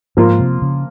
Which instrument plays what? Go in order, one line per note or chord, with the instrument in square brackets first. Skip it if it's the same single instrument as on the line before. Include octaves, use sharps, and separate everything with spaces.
[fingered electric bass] G#2 [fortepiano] F3 A#3 F4
[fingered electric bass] C3
C#3